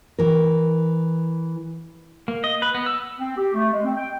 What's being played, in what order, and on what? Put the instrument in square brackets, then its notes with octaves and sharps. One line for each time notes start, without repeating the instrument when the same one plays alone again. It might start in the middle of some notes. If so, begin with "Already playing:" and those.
[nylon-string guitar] E3 A#4
[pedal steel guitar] A#3
D#5
B4
B3
E6
[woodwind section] C4
G4
A3
G#3
C4
G5